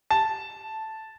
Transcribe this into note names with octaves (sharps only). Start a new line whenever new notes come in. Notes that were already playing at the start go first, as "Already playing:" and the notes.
A5